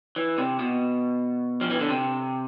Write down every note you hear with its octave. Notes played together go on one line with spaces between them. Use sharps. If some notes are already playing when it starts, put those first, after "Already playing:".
E3
C3
B2
F3
E3
D3
C3